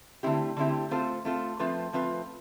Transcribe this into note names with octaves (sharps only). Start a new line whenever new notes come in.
D3 A3 C4 E4 G4
D3 A3 C4 E4 G4
A3 C4 F4 A4 C5
A3 C4 F4 A4 C5
F3 A3 C4 F4 B4
F3 A3 C4 F4 B4